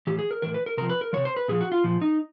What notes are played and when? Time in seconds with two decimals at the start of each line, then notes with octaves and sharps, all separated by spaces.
0.07 A2 E3 G4
0.19 G#4
0.31 A#4
0.42 A2 E3 A#4
0.54 B4
0.66 A#4
0.77 C3 F3 A#4
0.89 B4
1.01 A#4
1.13 C3 F3 C#5
1.25 C5
1.36 B4
1.48 A#2 F3 G#4
1.61 F#4
1.72 F4
1.84 A#2 F3
2.02 D#4